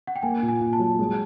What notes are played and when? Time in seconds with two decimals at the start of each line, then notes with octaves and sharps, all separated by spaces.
0.07 F#5
0.16 G5
0.22 A#3 G#5
0.42 A#2
0.48 G#5
0.61 A#2
0.73 A5
0.79 F#3
0.99 G#3